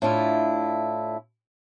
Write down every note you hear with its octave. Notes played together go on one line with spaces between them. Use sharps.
A2 D4 E4 F4